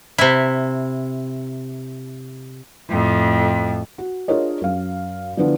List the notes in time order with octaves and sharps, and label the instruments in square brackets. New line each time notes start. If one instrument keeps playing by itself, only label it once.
[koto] C3 E4
[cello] F2 A2
[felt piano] F#4
D4 F4 G#4 A#4 C#5 D#5
F#2 F5
D3 E3 F3 B3 D4 F4